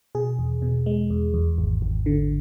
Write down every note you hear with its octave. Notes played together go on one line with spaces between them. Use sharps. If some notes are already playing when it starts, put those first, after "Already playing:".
B2 G#4
E2
B2
G#3
E2
E2
G#1
G#1
D3